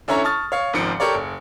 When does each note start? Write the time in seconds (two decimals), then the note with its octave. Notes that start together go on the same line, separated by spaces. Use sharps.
0.08 D3 C#4 E4 C#5 A#5
0.24 A5 C#6 D#6 F6 A6
0.52 C#5 F5
0.73 G#1 C#2 D#3 F3 C#7 D7
1.00 G4 A4 A#4 C#5 D5
1.14 F#1